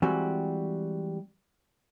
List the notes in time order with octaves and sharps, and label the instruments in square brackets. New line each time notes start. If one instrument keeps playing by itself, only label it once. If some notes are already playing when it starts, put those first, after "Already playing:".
[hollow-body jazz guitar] E3 G3 G#3 C4 F#4